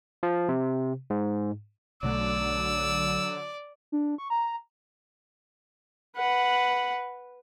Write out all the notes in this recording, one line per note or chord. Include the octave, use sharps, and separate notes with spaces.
F3
C3
G#2
B1 B2 D3 F#3 A3 D5 E6
D4
C#6
A#5
B4 F#5